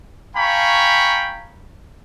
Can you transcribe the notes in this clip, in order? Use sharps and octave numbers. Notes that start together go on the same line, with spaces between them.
F5 G5 G#5 A#5 B5 C#6